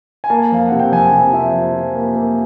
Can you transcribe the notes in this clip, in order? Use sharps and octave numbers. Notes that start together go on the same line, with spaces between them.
G#5
A#3 A5
F2 F5
C3 F#5
G5
F2 G#5
C3
F3 E5
F2
F3
A#3
A#3